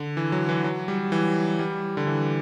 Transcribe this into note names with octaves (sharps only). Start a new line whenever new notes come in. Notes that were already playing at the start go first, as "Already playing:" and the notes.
Already playing: D3
E3
F#3
E3
F#3
G3
E3
G3
D3
E3